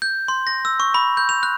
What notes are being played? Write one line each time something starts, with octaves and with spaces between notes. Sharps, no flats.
G6
C6
A#6
E6
C#6
B5
G6
F7
F#6